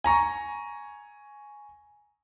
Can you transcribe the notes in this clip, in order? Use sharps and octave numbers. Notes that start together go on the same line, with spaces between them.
G#5 A#5 C#6